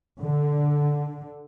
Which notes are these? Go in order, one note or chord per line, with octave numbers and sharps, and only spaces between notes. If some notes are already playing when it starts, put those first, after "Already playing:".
D3